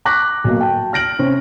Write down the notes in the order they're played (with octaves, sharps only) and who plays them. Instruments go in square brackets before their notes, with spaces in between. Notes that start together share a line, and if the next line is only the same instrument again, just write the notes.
[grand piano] C#6 D6 F#6 A#6 B6
B1 A#3
G5 A5
F6 A#6 D7 F#7
C3 C4 C#4